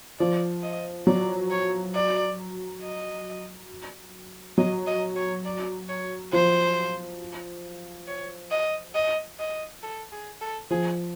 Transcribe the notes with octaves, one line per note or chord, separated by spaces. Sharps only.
F3 D5
D#5
F#3 D5
C#5
D5
D#5
F#3 D#5
D#5
C#5
D5
C#5
F3 C5
C#5
D#5
D#5
D#5
A4
G#4
A4
F3 G#4